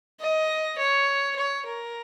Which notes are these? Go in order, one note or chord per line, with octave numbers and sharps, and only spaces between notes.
D#5
C#5
C#5
A#4